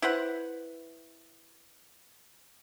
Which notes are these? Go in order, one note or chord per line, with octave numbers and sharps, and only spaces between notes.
E4 B4 C5 F#5